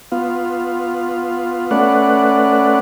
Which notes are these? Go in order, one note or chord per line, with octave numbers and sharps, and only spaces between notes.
B3 F4
A3 C#4 B4 D5 F#5